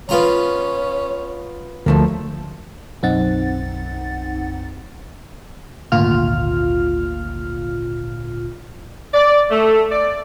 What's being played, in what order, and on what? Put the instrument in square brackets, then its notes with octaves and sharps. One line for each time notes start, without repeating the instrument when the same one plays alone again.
[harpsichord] B3 F4 A#5 [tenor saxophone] C#4
[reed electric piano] D2 [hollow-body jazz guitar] F3 A3 A#3
[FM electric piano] B1 F#2 C4 D#4 F#5 A6
G#1 D2 A#2 F4 F6
[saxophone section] D5
A3
D5